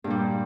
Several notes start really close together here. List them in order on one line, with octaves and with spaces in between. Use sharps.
G2 A#2 G3